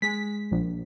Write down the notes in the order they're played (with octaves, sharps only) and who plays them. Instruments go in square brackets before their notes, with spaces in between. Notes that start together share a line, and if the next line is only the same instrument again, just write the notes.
[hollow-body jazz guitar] G#3 G#4 G#5 [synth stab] B6
[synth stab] A#1